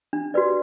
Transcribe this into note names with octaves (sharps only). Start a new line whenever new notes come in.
D4
F#4 B4 D5